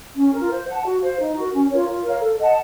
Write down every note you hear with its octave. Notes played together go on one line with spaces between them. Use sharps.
C#4
A#4
F4
C5
F#5 A5
F#4
C5 F5
D#4
F#4 A#4
C#4
F4 A#4 C#5
F4
A#4 C#5 F5
A4
D#5 F#5 A5